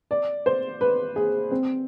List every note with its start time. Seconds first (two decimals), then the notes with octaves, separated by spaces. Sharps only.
0.11 D5
0.46 C5
0.81 B4
1.16 G#4
1.51 C4